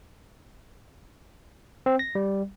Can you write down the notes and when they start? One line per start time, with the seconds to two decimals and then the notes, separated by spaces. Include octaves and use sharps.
1.86 C4
1.99 A#6
2.15 G3